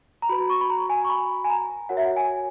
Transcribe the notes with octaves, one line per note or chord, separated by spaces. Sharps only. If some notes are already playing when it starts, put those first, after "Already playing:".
A#5
F#4 B4 B5
C#6
B5
A#5
G#5
C#6
B5
G#5
A#5
F#4 A#4 C#5 F#5
E5
F#5
G#5